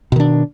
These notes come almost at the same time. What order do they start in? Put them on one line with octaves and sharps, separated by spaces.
B2 D#3 D4